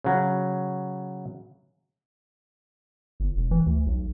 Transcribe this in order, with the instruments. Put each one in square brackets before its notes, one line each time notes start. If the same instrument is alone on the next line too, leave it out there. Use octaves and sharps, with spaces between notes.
[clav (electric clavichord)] C#3 F#3
[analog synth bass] G1
E1
E3
D2
B1